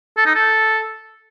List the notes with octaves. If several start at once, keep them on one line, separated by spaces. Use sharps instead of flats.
A4
D#4
A4